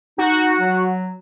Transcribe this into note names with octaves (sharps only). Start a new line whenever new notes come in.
D#4 F#4
F#3